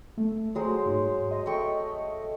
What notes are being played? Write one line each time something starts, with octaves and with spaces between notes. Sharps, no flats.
A3
F#3 G#3 C5
G#2
D#5
A3 G5 C#6